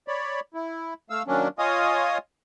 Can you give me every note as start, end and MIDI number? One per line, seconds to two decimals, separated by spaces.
0.08 0.40 73
0.08 0.40 74
0.08 0.40 83
0.54 0.94 64
1.10 1.23 57
1.10 1.23 77
1.10 1.23 88
1.27 1.48 51
1.27 1.48 54
1.27 1.48 58
1.27 1.48 61
1.27 1.48 62
1.59 2.18 65
1.59 2.18 73
1.59 2.18 75
1.59 2.18 77
1.59 2.18 80
1.59 2.18 87